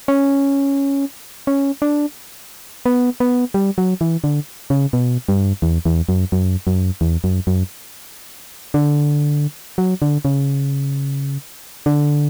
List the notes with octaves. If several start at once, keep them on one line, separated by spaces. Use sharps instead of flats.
C#4
C#4
D4
B3
B3
G3
F#3
E3
D3
C#3
B2
G2
E2
E2
F#2
F#2
F#2
E2
F#2
F#2
D3
F#3
D3
C#3
D3